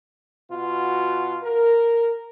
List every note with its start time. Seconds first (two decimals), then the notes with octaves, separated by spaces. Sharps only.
0.51 B2 F4 F#4
1.42 A#4